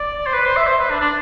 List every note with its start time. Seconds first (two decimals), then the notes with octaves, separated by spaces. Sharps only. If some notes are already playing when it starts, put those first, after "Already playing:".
Already playing: D5
0.27 C5
0.33 B4
0.46 C5
0.57 E5
0.67 C5
0.79 B4
0.90 D4
1.01 D4